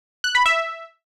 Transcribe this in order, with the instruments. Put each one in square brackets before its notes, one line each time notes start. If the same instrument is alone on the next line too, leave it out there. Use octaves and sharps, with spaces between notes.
[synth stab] F#6
B5
E5